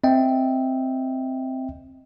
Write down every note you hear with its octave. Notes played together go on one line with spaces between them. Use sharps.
C4 D#5 E5 G5